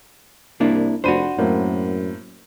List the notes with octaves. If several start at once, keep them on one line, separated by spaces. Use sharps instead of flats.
C2 A#3 D4 E4
F1 D4 F#4 C5 B5 D#7
F#2 A2 A#3 C4